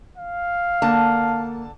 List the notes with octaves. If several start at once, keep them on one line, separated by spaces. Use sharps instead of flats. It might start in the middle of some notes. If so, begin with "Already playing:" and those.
F5
D3 A#3 A5